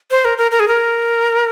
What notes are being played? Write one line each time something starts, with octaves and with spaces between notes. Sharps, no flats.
C5
A#4
A#4
A#4
G#4
A#4